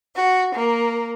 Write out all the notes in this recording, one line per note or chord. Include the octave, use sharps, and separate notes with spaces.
F#4
A#3